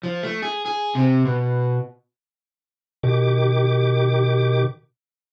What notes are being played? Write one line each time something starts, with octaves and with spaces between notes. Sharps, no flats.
F3
A3
G#4
G#4
C3
B2
B2 D#3 G4 D6